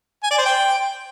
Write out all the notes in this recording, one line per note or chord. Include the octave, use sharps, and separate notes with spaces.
G#5
D5
C5
G5